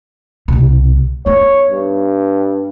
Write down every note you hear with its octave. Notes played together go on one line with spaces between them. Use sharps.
C2 B2
B3 D#4 C#5
G2